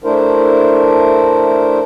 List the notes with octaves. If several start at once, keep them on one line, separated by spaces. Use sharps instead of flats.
A3 D4 E4 A#4 C5